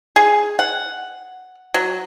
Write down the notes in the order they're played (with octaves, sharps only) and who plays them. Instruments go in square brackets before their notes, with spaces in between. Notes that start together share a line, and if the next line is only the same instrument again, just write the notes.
[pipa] G#4
F#5
F#3